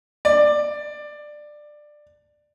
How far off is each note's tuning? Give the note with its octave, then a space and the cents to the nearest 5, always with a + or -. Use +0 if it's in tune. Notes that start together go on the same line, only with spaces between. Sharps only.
D5 +15